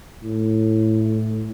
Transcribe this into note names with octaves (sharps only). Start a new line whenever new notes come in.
A2